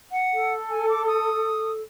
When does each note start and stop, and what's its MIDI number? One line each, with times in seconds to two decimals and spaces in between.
0.12 0.54 78
0.34 1.81 69
0.69 0.87 80
0.89 1.05 86
1.07 1.71 87